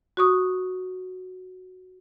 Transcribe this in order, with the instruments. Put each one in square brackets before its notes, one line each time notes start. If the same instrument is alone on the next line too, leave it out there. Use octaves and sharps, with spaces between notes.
[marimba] F#4 C#6 D#6